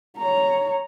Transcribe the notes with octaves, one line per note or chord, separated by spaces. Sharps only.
C#5 A#5